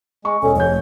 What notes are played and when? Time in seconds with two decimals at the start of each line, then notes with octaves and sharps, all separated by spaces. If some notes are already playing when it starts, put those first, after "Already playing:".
0.25 G#3 C#6
0.42 E1 C#4 A4 D#5
0.56 F1 G#2 C#5 G6